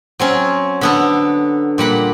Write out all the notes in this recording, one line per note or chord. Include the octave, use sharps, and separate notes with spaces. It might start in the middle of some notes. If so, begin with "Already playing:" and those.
F#3 C4 C#4
D3 B3 A4
A#2 G3 F#5 B5